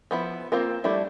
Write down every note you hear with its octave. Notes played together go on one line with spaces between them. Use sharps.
F3 B3 E4
A#3 C4 F4 A#4
G3 A3 D4 E4